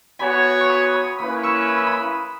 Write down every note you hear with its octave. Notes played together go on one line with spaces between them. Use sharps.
B3 F#4 C#5 G#5 B5
C#6
B5 D#6
B5 D#6
A#3 C#4 E4 B4 B5 D#6
C#6 E6
D#6
E6
B5 D#6